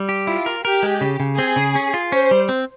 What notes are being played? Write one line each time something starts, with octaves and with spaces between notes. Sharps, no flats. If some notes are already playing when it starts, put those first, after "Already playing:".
Already playing: G3
G4
E4 F4
A#4
G4 A#4
G#3
C#3
C#3
C4 G#4
C#3
C#4
F4
C#4 C5
G3
C4